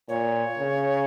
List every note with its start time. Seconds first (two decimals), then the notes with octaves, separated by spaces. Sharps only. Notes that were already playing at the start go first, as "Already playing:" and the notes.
0.09 A#2 C#5
0.58 C#3